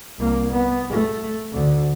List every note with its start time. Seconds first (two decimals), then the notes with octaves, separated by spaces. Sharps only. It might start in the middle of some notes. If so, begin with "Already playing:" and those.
0.19 C2 A#3
0.52 B3
0.90 A3
1.53 D2 D3